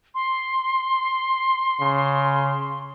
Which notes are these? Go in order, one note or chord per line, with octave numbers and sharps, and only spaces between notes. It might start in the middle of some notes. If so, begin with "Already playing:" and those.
C6
C#3